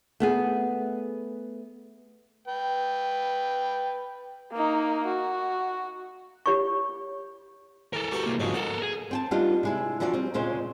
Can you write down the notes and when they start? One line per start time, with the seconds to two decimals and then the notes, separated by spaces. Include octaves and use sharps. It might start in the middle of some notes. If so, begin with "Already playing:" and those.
0.20 A3 B3 G#4
2.48 B4 G5
4.52 A#3 D#4
5.06 F#4
6.46 G4 C#5 B5 C#6
7.93 E3 A4 A#4
8.11 F#4 G4 B4
8.26 C2 A#3
8.40 G#2 D3 F3 F#3 G#3
8.54 A4 A#4 F#5
8.82 G#4
9.11 C4 G5 A5
9.31 G3 B3 D4 D#4 F4 G4
9.63 C3 G#3 E4
10.00 E3 F3 D4 F#4 D5
10.14 G3 C4
10.34 D2 A#2 C#3 G#3 C5